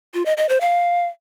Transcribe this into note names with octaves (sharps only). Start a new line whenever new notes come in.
F4
D#5
D#5
C5
F5